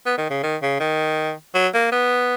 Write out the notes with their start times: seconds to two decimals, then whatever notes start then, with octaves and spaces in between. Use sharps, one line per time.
0.06 B3
0.18 D#3
0.30 C#3
0.43 D#3
0.62 C#3
0.80 D#3
1.55 F#3
1.74 A#3
1.92 B3